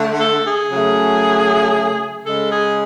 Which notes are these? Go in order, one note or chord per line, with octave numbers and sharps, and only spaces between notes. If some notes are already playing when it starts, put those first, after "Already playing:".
Already playing: D3 A3
A4
G#4
C#3 F#3 A3
C#3 G#3 A4
G#4